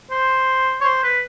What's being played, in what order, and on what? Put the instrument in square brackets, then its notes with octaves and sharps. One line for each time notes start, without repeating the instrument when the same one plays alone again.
[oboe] C5
C#5
C5
B4